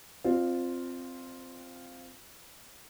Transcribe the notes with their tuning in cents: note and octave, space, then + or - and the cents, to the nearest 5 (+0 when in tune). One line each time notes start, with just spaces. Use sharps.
C4 +0 F4 +0 D5 +45